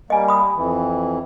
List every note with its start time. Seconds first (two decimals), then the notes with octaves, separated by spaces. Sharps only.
0.10 G3 A#3 D#5 G#5
0.28 B5 D#6
0.56 F2 E3